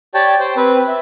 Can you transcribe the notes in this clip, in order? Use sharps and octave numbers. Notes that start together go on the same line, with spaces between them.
G4 C#5 D5 G5 A5
C5 G5
C4 B4
E5